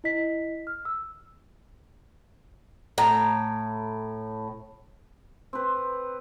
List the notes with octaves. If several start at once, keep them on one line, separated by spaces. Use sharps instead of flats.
E4 D#5 B6
F6
E6
A2 A#5
C4 B4